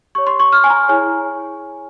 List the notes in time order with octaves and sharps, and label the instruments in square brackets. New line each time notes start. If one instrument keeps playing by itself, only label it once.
[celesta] G4 C#5 C#6
C6
C#6
F6
G#5
A#5
E4 G#4 C#5 G#5